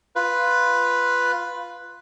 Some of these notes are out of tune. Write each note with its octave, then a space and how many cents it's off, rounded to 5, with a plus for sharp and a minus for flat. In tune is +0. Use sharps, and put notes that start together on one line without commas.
F4 +0 B4 +0 F5 +0